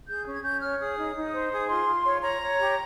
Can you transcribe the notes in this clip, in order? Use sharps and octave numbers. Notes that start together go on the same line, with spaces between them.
G#4 G6
C#4
G#6
C#4 G6
C#5 F6
G#4 D#6
D#4
D#4
C5
G#4 D#6
F4 C6
F4
C#5
C#5 A#5
C#5
G4